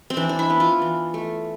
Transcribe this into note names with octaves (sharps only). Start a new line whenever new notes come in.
C4
E3 D4
D4
E4
B3
F4
E3
A3